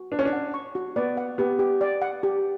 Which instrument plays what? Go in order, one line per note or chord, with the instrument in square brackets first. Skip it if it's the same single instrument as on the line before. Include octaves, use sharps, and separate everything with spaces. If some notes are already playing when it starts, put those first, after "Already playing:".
Already playing: [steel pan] F#4
[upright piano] D4 [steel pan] B4
[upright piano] C#4
D4
[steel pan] F#5
C#6
F#4
[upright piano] B3 [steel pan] D5
[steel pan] F#5
[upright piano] B3 [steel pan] G4
[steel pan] G4
D5
F#5
G4